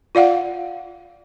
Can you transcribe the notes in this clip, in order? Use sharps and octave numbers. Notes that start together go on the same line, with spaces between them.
F4 D5 F5 F#5